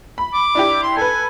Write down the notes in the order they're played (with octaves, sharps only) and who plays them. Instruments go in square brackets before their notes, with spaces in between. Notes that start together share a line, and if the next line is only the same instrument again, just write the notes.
[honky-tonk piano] B5
[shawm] D6
[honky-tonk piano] D4 E4 G4
[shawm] C6
[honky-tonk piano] A4 B4 [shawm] G#5